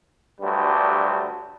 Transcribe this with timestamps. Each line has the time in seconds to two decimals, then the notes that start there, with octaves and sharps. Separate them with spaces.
0.41 D2 G2 F#3 G3